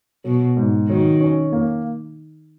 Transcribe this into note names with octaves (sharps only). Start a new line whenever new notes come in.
B2 F#3
G#2
D#3 F#3
C#4
A#3